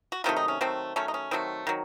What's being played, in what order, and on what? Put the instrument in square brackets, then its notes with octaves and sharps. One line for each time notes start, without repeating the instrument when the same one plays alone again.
[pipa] F#4
C3 D#3 F#3 A3 F4
D#4
C#4
D#3 F#3 A3 C4
D#3 F#3 A3 C#4
D#4
C#4
D#3 F#3 A3 C4
D#3 F#3